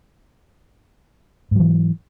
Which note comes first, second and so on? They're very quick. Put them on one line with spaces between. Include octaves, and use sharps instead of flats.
G#2 F#3 E3